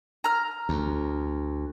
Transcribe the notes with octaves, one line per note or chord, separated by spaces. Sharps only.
A#5 F6
D2